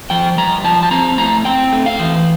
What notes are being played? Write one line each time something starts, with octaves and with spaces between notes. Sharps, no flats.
F3 G5
G2 A#5
F3 A5
A5
C4 A#5
A2 A#5
C4 G5
A3
F5
E3